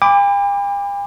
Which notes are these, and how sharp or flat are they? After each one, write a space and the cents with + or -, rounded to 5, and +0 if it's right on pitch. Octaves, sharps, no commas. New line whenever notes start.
G5 +45 B5 +15 D6 +0